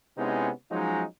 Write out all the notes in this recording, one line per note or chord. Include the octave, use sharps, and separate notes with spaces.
C3 G#3 B3 C#4 D#4 E4
F3 F#3 G#3 C#4 D#4